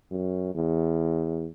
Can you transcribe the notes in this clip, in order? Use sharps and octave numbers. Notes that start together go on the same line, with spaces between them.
F#2
E2